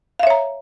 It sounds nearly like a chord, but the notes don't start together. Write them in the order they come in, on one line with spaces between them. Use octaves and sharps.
F5 E5 C#5 A#5